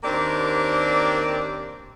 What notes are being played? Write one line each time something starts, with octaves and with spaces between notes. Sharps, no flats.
D#2 A#3 C4 D4 G4 D5